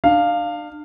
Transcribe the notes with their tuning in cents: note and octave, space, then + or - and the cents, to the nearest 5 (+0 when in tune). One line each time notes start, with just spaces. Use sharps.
D4 +35 F5 +0